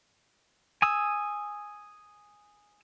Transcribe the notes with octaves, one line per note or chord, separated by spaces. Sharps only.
G#5 D#6 E6